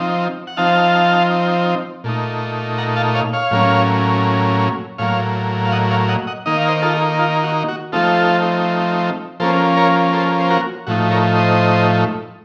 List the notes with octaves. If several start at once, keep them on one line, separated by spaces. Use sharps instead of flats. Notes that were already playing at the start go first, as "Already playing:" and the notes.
Already playing: F3 C4 D#4
F#5
F3 C4 D#4 F5 A5
A#2 A3 D#4
F#5 A#5
F5 A5
C#5 F5
C#5 F5
A2 F#3 A#3 C#4
A2 F#3 A#3 C#5 F5
F5
D#5 F#5
C#5 F5
D#5 F#5
D#5 F#5
D#3 A#3 D#4 D#5
F5
C5 D#5
F4 A4
F4
F#4
F#4
F3 A3 C4 D#4 F4 A4
F3 A#3 C#4 A4 C5
A#4 C#5
A4 C5
C5
F#4 A#4
A2 F3 A3 D#4 F#4
A#4 C#5
C5 D#5